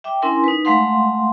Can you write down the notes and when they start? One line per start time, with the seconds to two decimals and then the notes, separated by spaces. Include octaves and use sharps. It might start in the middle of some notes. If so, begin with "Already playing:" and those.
0.04 E5 G5 D6
0.22 C#4 D4 E4 A#4 G#5 C6
0.44 D#4 B4
0.65 G#3 A3 F5 F#5 C6